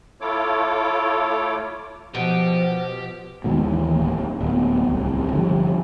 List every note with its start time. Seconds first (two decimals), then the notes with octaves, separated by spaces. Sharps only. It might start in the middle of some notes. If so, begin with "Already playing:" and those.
0.21 A3 E4 F4 A4 C#5 D6
2.15 B2 F3 G4 C5
3.44 G#1 D#2 G#2 B2
3.63 D#2 E3
3.96 D1 B1 A#3
4.41 D1 B3
4.87 D1 C2
5.32 G1 D3 F3 G3